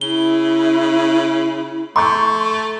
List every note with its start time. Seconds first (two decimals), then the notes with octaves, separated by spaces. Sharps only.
0.01 C#3 E4 G7
1.96 A3 A#5 C6 C#6 G6